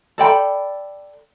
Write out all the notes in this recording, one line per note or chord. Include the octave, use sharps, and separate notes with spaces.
A4 D5 G5 B5